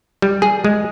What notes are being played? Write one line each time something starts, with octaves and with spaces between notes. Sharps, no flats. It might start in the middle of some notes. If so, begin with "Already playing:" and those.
G3
G#4
G#3